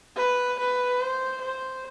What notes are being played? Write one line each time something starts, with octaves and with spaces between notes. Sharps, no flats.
B4
B4
C5
C5